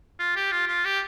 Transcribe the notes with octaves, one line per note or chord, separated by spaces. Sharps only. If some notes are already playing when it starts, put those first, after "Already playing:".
F4
G4
F4
F4
G4